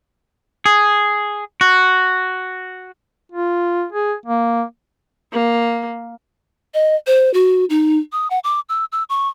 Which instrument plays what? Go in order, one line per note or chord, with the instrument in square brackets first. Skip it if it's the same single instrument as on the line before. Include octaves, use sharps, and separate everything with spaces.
[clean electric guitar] G#4
F#4
[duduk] F4
G#4
A#3
[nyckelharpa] A#3
[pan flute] D#5
C5
F#4
D#4
D#6
F#5
D6
E6
E6
C#6